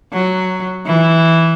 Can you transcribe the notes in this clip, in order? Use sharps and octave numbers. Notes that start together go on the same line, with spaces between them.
F#3
E3